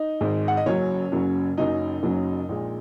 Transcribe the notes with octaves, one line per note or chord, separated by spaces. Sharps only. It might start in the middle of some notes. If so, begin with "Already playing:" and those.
Already playing: D#4 D#5
G#1 G#2 G#3
F#5
D#5
F#1 F#2 C#3 F#3 C#4 C#5
F#1 F#2 C#3 F#3
F#1 F#2 C#3 F#3 D#4 D#5
F#1 F#2 C#3 F#3
A#1 A#2 G#3